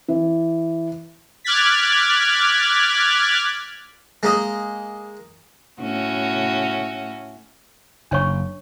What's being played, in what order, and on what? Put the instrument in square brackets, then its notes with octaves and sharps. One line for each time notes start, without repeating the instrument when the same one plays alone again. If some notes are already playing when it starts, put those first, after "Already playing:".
[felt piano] E3
[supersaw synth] D6 F6 F#6 G#6 A6 B6
[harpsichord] G#3 A#3 D#5
[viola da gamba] A2 C#4 F#4
[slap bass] F#1 [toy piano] D4 C#5 C#6